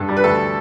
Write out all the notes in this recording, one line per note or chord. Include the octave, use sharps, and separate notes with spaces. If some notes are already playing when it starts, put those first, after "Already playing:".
Already playing: G2 A4
G3
B4
D2 A4